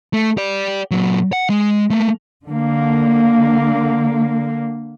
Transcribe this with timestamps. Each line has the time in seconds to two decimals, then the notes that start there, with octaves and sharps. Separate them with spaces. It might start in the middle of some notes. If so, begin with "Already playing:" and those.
0.13 A3
0.37 G4 D5
0.91 A#2 F#3
1.33 F#5
1.50 G#3
1.91 A3 A#3
2.46 D3 A#3